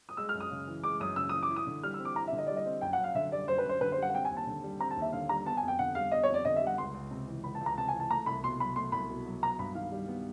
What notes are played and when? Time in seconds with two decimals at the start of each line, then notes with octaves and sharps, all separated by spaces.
0.09 D#6
0.17 G#3 E6
0.29 F6
0.34 F#2
0.40 D#6
0.51 C#3
0.67 E3
0.84 G#3 D6
1.00 F#2 D#6
1.16 C#3 E6
1.29 E3 D#6
1.43 D6
1.50 E4
1.56 D#6
1.67 D3
1.83 G3 F6
1.94 E6
2.00 C4
2.05 D6
2.16 E4 A#5
2.28 E5
2.33 D3
2.38 D#5
2.47 G3 D5
2.57 D#5
2.66 C4
2.81 F#2 G5
2.93 F#5
2.99 F#2
3.04 F5
3.15 D3 E5
3.32 G3 D5
3.48 F#2 C5
3.58 B4
3.65 F#2 C5
3.81 D3 B4
3.92 C5
3.98 G3 F#5
4.10 F#5
4.14 C4 G5
4.25 G#5
4.30 D#2
4.37 A5
4.47 D3
4.63 G3
4.80 C4 A#5
4.91 A5
4.97 D#2
5.02 E5
5.12 D3 F5
5.29 G3 A#5
5.45 B3 A5
5.57 G#5
5.63 F2
5.68 G5
5.79 D3 F#5
5.95 G3 F5
6.12 B3 D#5
6.23 C#5
6.29 F2
6.34 D5
6.45 D3 D#5
6.56 E5
6.62 G3
6.67 F#5
6.78 C#2 C6
6.94 C#2
7.11 C3
7.28 E3
7.44 C#2 B5
7.55 A5
7.61 C#2
7.66 A#5
7.78 C3 A5
7.88 G#5
7.94 E3
8.00 A5
8.10 A3 A#5
8.26 C2 B5
8.43 B2 C6
8.60 F#3 B5
8.76 A3 C6
8.92 C2 B5
9.10 B2
9.26 F#3
9.42 B3 A#5
9.59 G2 B5
9.75 D#3 F5
9.92 G3
10.08 B3